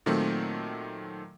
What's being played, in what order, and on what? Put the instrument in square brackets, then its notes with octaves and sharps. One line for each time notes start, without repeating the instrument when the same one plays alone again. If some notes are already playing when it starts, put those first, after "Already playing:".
[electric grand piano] A#2 D#3 F#3 A3 C4